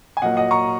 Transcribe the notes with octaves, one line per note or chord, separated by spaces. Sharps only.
G#5
A#2 F#3 A#3 D#5 F#5
D#5 F#5
A#5 C#6